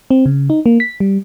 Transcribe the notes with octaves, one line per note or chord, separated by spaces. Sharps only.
C4
C#3
D#4
A#3
B6
G3